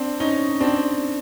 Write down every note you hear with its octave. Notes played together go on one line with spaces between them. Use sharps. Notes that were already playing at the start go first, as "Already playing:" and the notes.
Already playing: C4 D4
C#4 D#4
C4 D4